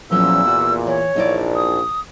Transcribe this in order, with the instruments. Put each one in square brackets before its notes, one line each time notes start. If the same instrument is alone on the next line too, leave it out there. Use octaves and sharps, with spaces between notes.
[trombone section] E2 A#2 [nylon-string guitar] F3 F#3 C#4 [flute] E6
[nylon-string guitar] F#4
[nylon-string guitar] E3 [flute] C#5
[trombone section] A#1 [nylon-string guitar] D#4 E4 D5
[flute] D#6